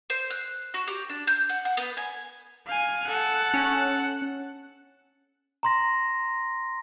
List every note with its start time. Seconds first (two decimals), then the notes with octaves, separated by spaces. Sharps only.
0.10 C5
0.30 F#6
0.74 F#4
0.87 G4
1.09 D4
1.27 G6
1.49 F#5
1.65 F#5
1.77 B3
1.97 G#5
2.67 F5 G#5
3.07 A4 F#5
3.54 C#4
5.63 A#5 C6 A#6